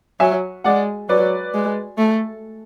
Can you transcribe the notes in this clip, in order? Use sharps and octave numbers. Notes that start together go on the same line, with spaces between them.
F#3 E5 G#5
G#3 D5 F#5
F#3 B4 D5
G#3
A3